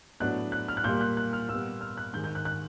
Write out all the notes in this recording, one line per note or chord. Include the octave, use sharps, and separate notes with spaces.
A2 F#3 B3 D4 F#6
F#6
F6
F#6
A#2 G3 A#3 G6
F#6
F#6
F6
A#2 G3 B3 E6
F6
F#6
G#2 D#3 G#3 G6
G6
F#6
F#6